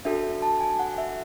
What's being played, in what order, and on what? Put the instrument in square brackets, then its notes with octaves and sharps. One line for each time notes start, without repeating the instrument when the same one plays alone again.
[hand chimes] D4 F#4 A4 E5
A5
G#5
F#5
E5